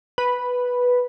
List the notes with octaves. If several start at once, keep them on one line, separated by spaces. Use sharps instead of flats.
B4